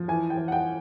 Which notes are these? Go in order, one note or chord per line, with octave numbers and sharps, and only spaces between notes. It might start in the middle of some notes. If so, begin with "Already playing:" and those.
Already playing: F3
E3 G#5
G5
E3
F#5
G5